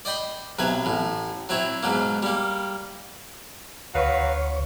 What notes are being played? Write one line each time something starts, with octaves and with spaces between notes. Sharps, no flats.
D5 D#5 G5 B5 C6
B1 C3 F#3 B4 G#5
A1 A2
F#3 C4 E4 C#5
G#2 B2 F#3 A#3
G3 A#3
D2 F#3 B4 C#5 F5